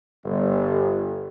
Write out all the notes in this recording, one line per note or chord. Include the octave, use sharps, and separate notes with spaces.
G1